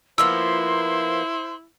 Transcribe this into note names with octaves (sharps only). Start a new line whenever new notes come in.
F3 A#3 B3 E4 C5 C6 E6